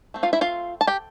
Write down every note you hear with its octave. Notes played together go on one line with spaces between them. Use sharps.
A3 C4
F4 F5
E4 E5
F4 F5
A5
G4 G5